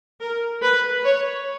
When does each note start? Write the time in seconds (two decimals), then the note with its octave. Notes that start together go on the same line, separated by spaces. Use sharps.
0.21 A#4
0.63 B4
1.05 C#5